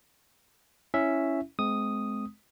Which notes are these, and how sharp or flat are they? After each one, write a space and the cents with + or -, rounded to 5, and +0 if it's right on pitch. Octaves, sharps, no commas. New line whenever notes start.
C#4 +0 E4 +0 E5 +0
G#3 +30 C4 -25 D#6 +0